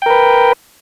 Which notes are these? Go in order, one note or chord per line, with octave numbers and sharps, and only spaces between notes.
A#4 B4 G5